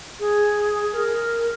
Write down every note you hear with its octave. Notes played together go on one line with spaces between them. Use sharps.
G#4
A#4